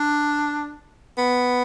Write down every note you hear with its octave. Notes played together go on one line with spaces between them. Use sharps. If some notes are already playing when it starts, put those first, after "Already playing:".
Already playing: D4
B3